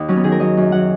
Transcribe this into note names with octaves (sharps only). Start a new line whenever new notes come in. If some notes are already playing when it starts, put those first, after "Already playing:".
Already playing: D#2 D#4
F#3 C#4
B3
D#3 G#4
A#4
F#3 D#5
F#2
F#3 F#5